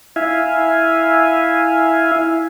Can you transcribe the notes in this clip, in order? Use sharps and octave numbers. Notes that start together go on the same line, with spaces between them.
E4 E5 F5 G#5